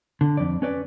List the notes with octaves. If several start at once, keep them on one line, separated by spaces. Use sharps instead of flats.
D3
F2 D5
C#4 B4 D5